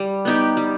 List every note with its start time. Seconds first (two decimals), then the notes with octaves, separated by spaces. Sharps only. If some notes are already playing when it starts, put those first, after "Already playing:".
Already playing: G3
0.25 B3 D#4 G4
0.57 G3